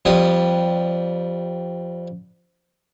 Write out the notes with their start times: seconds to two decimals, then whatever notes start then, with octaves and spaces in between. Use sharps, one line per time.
0.05 F2 G3 D#6